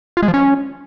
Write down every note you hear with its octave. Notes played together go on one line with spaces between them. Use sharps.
F4
G#3
F3
C#4